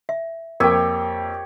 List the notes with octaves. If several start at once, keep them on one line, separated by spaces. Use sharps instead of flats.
E5
F2 A#3 G4 A#4 C#5 G5